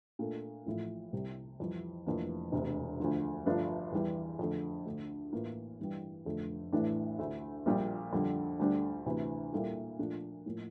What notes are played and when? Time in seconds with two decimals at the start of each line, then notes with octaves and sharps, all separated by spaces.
0.19 A#2 A3 D4 A4
0.66 A1 A2 F3 A3 E4
1.13 C2 C3 G3
1.60 F2 E3 G3
2.06 F1 F2 E3 A#3 D4
2.52 E1 D2 C3
3.00 D2 D3 F3
3.46 G1 G2 F3 A3 D4
3.92 E2 E3 G3
4.39 F2 D3 A3
4.85 D2 D3 A3
5.32 A1 A2 E3 A#3 F4
5.80 G2 E3 G3
6.25 F1 F2 D3 A3
6.72 A1 A2 E3 A3 D4
7.19 D2 D3 A3 E4
7.66 A#1 A#2 G3
8.12 F2 D3 G3
8.59 D2 D3 G3 D4
9.06 D2 C3 E3
9.53 A#2 G3 A#3 E4 A4
9.99 A#2 F3 A3 D4
10.46 A2 F3 A#3